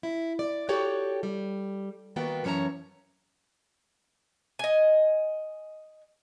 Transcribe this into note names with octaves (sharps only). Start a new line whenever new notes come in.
E4
D5
F#4 G4 A4 C#5 G5
G3
D#3 A#3 B3 F#4 G5
F#2 E3 C#4 C#5 A5 A#5
D#5 G#5